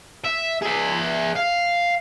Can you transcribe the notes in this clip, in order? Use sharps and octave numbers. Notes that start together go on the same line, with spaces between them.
E5
G#4 E5
F5